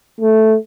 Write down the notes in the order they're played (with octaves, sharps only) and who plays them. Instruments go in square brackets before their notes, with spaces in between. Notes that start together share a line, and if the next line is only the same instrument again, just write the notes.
[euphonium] A3